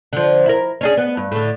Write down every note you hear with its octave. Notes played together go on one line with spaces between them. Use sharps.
D3 F3
E4 A#4
C#4 D4 G#4
B3
G2
A2 D3